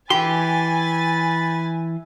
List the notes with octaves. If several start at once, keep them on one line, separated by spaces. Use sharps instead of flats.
E3 G4 G#5 B5 C6 A6